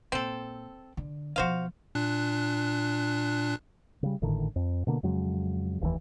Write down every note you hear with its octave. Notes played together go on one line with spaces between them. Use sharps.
A#2 C4 A4
D3
B2 F3 F#4 C5 F5
A#2 D4 F#6
C#3 G3
G#1 A2 D3 D#3
F2
B2 D3 A#3
F2 C#3 F#3 G#3
F1 D#2 B2 E3